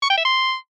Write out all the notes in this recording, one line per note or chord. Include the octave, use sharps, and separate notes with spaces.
C#6
G5
E5
C6